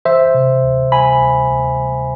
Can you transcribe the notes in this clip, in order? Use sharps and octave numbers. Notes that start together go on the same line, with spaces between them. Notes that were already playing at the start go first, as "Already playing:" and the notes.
E3 C5 E5
C3
D2
D2 G#5 B5
D2
D2